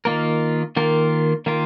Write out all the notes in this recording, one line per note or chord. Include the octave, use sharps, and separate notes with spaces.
D#3 A#3 F4 A#4
D#3 A#3 F4 A#4
D#3 A#3 F4 A#4